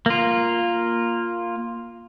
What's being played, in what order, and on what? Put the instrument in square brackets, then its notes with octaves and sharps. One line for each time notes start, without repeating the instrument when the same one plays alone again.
[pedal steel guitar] A#3 F4